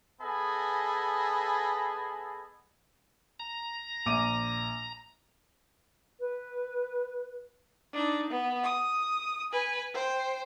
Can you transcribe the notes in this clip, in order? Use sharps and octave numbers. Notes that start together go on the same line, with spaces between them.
B3 G#4 A4 D#5 G#5 B5
A#5
A#1 D6 D#7
B4
D4 D#4
B3
D#6
B4 G#5
C5 G5